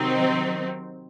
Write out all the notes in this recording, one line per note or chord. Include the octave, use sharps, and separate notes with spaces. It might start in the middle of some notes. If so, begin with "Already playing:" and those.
Already playing: C3 D#3 F#3 C4 D#4